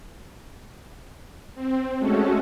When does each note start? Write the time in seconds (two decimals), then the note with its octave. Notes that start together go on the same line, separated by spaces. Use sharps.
1.55 C4
1.98 G#3 A3 C#4 F#4 A4